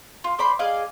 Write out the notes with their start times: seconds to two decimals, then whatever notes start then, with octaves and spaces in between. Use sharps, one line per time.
0.24 F4
0.39 C5 D5 B5 C6
0.59 G#4 D5 D#5 F5